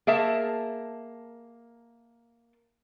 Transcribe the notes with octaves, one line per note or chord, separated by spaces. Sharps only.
A#3 G#4 E5 A5